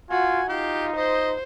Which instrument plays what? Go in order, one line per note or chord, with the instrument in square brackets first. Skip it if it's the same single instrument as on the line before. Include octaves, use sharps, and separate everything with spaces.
[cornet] F4 [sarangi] F#4 [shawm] G#5
[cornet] D#4 [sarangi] F4 [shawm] G4
[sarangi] C5 [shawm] D#5